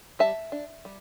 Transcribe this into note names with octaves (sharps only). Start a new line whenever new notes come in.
G3 E5 A5
D4
G3